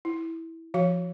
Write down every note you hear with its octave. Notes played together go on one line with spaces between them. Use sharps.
E4
F3 F#4 F5